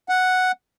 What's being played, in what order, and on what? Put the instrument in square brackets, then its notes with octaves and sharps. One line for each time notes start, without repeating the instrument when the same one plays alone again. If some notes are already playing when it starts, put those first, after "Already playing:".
[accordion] F#5